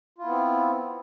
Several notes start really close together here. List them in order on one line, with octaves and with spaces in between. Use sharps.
F4 E4 B3 C4